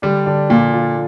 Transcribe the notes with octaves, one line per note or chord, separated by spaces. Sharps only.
D3 G3 D4
D3 D4
A#2 F3 F4
F3 F4